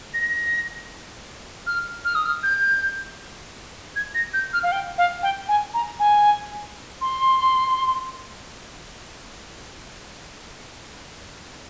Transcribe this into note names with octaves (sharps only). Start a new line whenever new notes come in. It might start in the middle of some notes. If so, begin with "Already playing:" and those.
A#6
F6
F6
D#6
F6
G6
G#6
A#6
G6
F6
F5
G5
F5
G5
G#5
A#5
G#5
C6